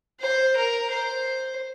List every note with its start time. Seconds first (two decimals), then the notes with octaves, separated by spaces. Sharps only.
0.21 C5
0.56 A#4
0.90 C5